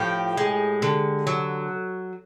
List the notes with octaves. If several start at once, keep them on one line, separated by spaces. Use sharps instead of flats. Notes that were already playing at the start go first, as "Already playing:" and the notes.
Already playing: A2 F3 G4
G#3
D3
F#3